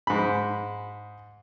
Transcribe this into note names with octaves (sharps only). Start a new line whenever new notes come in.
G#2 B5